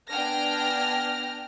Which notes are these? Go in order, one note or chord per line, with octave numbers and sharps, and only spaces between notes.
B3 D4 G5 G#5 F6 A#6